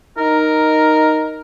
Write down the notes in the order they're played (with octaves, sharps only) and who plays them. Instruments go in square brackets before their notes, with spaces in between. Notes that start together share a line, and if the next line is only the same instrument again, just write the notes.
[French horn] D#4 [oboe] A#4